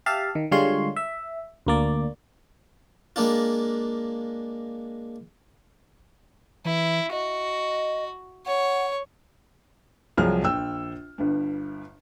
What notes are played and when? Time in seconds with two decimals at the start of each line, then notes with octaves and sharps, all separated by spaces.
0.06 G4 E5 F5 A5
0.35 D#3
0.51 D3 G3 G#3 F4 C#5 C6
0.96 E5
1.67 D2 A#3 D5
3.16 G#3 A#3 D4 F4
6.65 E3 E4
7.12 F#4 D#5
8.46 C#5 F#5
10.17 C2 F3 F#3 G#4 F6
10.43 A#1 G5 E6
11.18 G1 G2